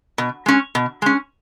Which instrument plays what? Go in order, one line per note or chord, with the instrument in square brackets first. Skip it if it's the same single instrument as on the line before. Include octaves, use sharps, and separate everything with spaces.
[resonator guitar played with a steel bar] B2
G#3 C#4
B2
G#3 C#4